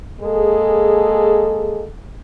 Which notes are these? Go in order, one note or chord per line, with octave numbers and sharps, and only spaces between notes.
G#3 A#3 G#4 A4